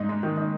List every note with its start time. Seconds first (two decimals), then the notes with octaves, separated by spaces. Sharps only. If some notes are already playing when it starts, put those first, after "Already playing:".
Already playing: G#2 D#4
0.09 G#3
0.23 D#3
0.37 D#4